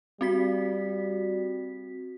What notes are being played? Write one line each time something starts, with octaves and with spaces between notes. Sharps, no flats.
G3 C4 F#4 B6